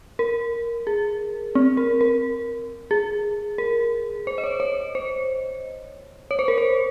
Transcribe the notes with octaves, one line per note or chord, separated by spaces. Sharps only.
A#4
G#4
C4
A#4
A#4
G#4
A#4
C5
D#5
C#5
C#5
C5
C#5
C5
A#4
C5